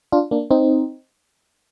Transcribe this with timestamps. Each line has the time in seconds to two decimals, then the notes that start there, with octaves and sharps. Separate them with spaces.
0.12 D4 F4
0.31 A#3 D4
0.51 C4 D#4